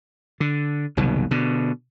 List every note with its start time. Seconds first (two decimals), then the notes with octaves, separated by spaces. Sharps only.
0.40 D3
0.97 F#1 C2 B2 D#3
1.31 B2 D3